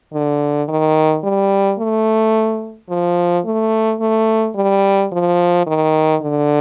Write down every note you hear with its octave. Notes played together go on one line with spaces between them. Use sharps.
D3
D#3
G3
A3
F3
A3
A3
G3
F3
D#3
D3